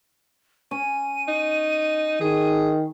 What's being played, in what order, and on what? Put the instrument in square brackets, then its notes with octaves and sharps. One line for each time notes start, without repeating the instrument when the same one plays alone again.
[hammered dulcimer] C#4 [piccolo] D#7
[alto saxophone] D#4
[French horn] D#3 [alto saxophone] G#4